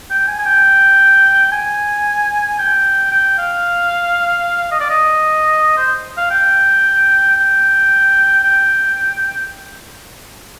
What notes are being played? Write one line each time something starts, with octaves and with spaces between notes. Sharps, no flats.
G5
G#5
G#5
G5
G#5
G5
G5
F5
D#5
D5
D#5
C5
F5
G5
G5
G5